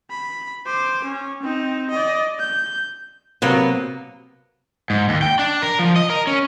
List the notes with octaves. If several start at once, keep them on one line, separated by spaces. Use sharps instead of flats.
B5
C5 D6
C#4
C4 D#4
D5 D#5
G6
C3 F#3 A#3 B3
G#2
D#2
G5
D4
A#4
F3
D#5
A#4
C#4